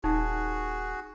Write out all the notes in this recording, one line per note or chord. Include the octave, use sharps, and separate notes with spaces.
D#1 D#4 F#4 G#4